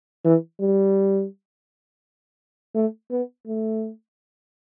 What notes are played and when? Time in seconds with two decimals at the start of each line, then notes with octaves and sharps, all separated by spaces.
0.25 E3
0.61 G3
2.75 A3
3.11 B3
3.47 A3